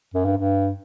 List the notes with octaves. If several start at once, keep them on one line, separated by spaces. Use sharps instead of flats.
F#2
G2
G2